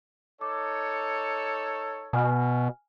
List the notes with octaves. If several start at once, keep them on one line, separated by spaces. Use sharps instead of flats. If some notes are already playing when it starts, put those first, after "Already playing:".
D#4 A4 C#5 D6
B2 G#5 F6